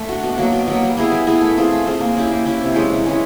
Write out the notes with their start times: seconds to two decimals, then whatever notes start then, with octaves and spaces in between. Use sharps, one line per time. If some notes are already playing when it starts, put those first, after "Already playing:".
Already playing: A3
0.09 D4 F#4
0.23 B2
0.38 F#3 A#3
0.52 B2
0.68 F#3 A#3
0.82 G3
0.97 B3 E4 G#4
1.12 G3
1.27 B3 E4 G#4
1.41 A3
1.57 C4 F4 G#4
1.71 A3
1.86 C4 F4 G#4
2.00 A#3
2.16 C#4 E4 G4
2.31 A#3
2.45 C#4 E4 G4
2.61 C3
2.75 E3 G#3 C#4
2.90 C3
3.05 E3 G#3 C#4